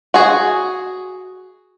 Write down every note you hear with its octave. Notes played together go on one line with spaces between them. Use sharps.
F#4 G#4